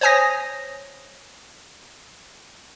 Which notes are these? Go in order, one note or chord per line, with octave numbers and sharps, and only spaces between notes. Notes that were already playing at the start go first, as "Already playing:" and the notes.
C5 C#5 G#5 D#6 A#6